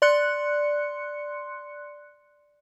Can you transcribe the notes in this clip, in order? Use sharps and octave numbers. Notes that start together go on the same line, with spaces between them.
D5 C6 F#6 C#7